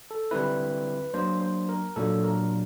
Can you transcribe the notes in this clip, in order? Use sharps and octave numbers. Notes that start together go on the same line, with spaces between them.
A4
D3 G3 C4 E4 B4
F#3 A#3 D4 C5
C5
A#4
A#2 F#3 A#3 D4 A4
A#4